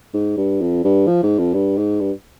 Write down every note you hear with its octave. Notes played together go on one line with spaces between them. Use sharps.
G#2
G2
F2
G2
F3
G#2
F2
G2
G#2
G2